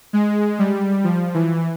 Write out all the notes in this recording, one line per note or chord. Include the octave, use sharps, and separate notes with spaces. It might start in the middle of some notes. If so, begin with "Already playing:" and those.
G#3
G3
F3
E3